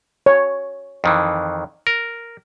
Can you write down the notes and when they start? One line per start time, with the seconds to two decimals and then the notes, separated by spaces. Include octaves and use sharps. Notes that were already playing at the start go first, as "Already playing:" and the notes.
0.26 C#5
1.04 F2 D#3 E3
1.87 A#4